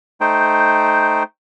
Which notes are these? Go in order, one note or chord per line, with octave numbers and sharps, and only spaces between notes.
A3 D#4 C5 G5